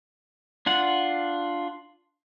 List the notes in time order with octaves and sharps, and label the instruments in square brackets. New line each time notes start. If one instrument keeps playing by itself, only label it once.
[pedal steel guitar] D4 F4 F#5